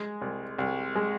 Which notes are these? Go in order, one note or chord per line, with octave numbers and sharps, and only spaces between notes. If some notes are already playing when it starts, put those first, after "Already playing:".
Already playing: G#3
C2
C2
G#3